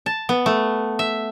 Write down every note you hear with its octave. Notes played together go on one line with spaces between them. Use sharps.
A5
B3
A3
E5